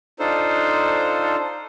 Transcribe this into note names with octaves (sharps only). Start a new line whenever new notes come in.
D4 D#4 F4 A4 C5